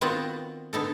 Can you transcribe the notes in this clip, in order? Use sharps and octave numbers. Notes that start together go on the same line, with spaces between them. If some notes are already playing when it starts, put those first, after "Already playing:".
D#3 B3 C4 F4 F#4 F#5
D3 B3 D#4 A4